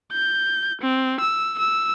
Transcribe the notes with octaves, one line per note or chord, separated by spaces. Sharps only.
G6
C4
E6
E6